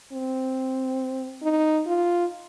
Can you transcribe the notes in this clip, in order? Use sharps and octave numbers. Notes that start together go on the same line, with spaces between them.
C4
D#4
F4